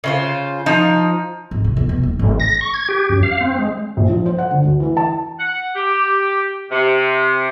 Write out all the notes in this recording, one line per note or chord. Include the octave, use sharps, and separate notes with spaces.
C#3 F4 C5
F3 D#4
G#1
C3
E2
B2
D#1
G#1
A#6
C#6
G#6
G4
F#2
F5
C4
G#3
A#1
F3
C5
F#5
D3
D2
E3
A5
F#5
G4
C3